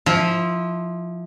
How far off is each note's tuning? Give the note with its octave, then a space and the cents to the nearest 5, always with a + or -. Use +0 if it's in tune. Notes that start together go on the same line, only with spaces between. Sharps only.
F3 +0 E4 -20